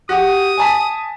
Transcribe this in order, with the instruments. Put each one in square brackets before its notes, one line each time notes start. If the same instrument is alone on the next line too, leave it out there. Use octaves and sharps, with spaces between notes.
[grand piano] F#4 G4 [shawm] D#6
[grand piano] G#5 A5 B6